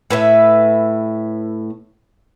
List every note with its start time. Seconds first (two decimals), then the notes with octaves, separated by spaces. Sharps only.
0.10 A2 B4 E5